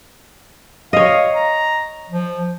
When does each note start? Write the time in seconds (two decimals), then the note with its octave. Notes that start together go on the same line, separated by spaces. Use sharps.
0.93 C#5 D#5 F5
1.34 A#5
2.10 F3